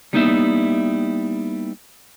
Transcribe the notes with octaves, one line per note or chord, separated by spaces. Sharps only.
G3 A#3 B3 D#4 E4 E5